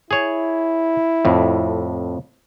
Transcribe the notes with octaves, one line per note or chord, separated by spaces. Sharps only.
E4 G#4 C#5
F2 A2